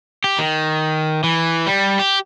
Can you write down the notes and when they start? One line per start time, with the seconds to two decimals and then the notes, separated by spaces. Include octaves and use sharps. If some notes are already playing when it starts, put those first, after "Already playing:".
0.24 G4
0.39 D#3
1.23 E3
1.66 G3
1.99 G4